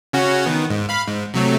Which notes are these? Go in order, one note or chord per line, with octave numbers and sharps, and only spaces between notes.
C#3 C#4 F#4
D#3 B3
G#2
F5 B5
G#2
C3 F#3 A3